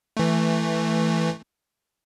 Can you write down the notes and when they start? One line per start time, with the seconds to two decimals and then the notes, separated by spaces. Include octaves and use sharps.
0.17 E3 A3